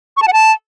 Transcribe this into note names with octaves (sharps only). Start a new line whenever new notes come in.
C#6
A5
F#5
A5